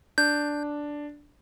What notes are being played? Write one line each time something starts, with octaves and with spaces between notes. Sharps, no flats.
D4 G6